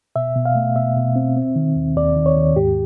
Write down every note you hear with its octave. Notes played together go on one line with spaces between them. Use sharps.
B2 E5
B2
F5
A3
B2 E5
B2
C4
C4
D#3
D#2
D#2 D5
D#3
C#5
D#2
G#2 G4